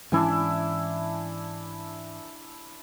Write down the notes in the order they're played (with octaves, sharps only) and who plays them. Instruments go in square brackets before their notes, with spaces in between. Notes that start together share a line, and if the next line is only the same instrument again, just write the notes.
[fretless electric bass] G#2 E3 C#4 [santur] D4 E4 G#5